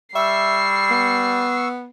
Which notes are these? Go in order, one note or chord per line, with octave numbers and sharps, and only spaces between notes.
G3 E5 C#6 E6 C7
B3